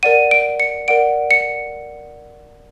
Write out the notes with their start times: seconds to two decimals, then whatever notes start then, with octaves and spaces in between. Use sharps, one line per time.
0.03 A#4 D5 F#5 D#7
0.31 D7
0.60 C#7
0.88 A#4 D5 F#5 D7
1.31 C#7